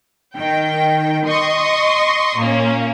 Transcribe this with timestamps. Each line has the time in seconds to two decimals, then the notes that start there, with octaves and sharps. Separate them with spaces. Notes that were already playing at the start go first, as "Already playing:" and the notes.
0.36 D#3 G5
1.28 D#5 C6 C#6 D#6
2.38 A#2 A#3 C#4